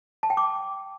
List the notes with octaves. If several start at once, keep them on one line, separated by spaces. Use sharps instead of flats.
A5
G5
D6